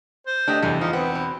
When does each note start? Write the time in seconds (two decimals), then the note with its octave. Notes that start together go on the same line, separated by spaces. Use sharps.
0.27 C5
0.48 A3 D4 G4 D#5
0.62 E2 C3 A3
0.81 F3 D#4
0.93 B3 C4
1.15 B2